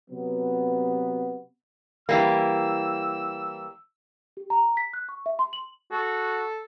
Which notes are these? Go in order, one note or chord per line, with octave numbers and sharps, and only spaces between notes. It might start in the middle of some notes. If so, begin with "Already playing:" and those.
C3 F#3 B3
E3 G3 A#3 E6
G4
A#5
B6
F#6
C#6
E5
C6
F#7
F#4 A4